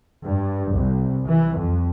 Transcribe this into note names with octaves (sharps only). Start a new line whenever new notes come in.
G2
C2
E3
F2